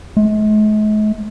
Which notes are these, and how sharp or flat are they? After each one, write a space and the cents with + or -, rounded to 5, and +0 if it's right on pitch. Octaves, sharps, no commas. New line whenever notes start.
G#3 +45